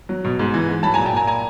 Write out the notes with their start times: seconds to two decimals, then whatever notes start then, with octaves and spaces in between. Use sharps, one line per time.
0.09 F#3
0.25 B2
0.39 G#2
0.54 E3
0.69 G#2
0.83 F#3 A5 B5
0.94 G#5 A#5
0.98 A#2
1.06 G5 A5
1.13 A#2 G#5 A#5
1.27 G#5 A#5